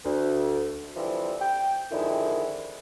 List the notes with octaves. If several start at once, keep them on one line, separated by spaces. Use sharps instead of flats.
D2
D3 E3 F3 G3 C4 E4
G5
F2 D3 D#3 G#3 D4 E4